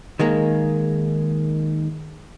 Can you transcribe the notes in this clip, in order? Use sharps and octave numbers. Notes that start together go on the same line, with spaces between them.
D#3 G#3 A#3